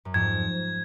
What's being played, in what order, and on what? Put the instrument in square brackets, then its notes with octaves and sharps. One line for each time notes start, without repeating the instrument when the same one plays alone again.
[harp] F#2
[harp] F2 G#2 [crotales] G#6